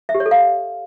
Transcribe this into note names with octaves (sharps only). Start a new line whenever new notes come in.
E5
G4
C#5
A4
F5